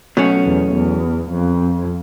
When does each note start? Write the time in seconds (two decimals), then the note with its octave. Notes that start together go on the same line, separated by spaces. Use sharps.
0.17 B2 F#3 A3 C#4 F#4
0.45 E2
0.74 E2
1.31 F2